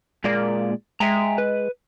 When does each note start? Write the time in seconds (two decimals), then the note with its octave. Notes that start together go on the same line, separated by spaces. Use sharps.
0.24 A#2 G#3 A#3 D5
1.00 G#3 E5 G5 A#5
1.38 B4